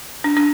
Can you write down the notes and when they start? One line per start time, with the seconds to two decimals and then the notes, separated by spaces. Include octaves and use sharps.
0.24 D4
0.37 D4